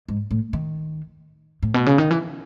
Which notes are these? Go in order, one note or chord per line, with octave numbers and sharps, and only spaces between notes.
G#2
A2
D#3
A2
B2
C#3
D#3
E3